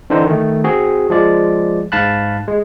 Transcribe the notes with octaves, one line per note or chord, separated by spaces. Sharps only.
D3 E3 C4 D4 D#4 C5
D#3 A3
C4 F#4 G#4
F3 G#3 D5
G#2 F5 A5 B5 F#6
G#3